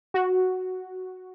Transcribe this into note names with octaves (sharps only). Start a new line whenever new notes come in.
F#4